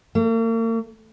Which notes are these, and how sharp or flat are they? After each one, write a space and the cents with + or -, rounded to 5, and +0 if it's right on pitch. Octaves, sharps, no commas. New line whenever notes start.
A#3 -45